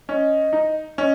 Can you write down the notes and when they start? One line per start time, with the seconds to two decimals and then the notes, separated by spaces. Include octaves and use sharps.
0.09 C#4 D#5
0.53 D#4
0.98 C#4 D#5